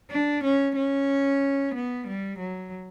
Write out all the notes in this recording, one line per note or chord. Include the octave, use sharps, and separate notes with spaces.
D4
C#4
C#4
B3
G3
F#3